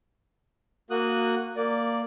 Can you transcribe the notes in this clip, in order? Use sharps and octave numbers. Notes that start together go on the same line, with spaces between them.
A#3 F#4 D#6 F#6
A#3 D5